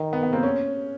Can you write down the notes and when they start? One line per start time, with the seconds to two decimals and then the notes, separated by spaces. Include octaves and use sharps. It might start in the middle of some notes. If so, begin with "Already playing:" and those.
Already playing: D#3 D#4
0.13 B3
0.23 B3
0.33 A#3 C4
0.43 C#4